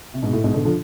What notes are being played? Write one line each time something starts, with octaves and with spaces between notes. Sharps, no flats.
C3
G#2 B2
A2
G#2 B2
B2 D3
D3 F3